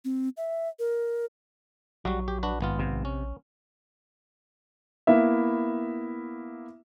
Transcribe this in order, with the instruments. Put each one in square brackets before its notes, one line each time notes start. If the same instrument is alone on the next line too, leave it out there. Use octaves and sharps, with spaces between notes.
[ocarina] C4
E5
A#4
[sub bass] A#1 [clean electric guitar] F#3 [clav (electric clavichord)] G3 F#4
[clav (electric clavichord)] G4
D4 F#4 B4
G#1 B3 F4
[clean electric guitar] C3
[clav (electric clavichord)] C#4
[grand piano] A#3 B3 E4 E5